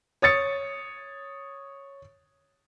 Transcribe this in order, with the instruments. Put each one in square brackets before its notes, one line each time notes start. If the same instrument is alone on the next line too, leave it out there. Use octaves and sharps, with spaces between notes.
[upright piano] C#5 D#6 A6 C#7